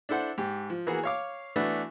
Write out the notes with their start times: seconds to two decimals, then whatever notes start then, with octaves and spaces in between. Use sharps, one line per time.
0.09 D4 E4 A4 C5 F#5
0.38 G#2 G4
0.70 F3
0.87 E3 A#3 B3 F#4 G#4
1.03 C#5 F5 D6
1.56 E3 A3 B3 D4 F#4